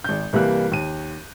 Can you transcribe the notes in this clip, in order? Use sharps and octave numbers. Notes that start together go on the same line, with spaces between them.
G#1 G6
C2 E3 G3 A#3 F#6
D#2 D#7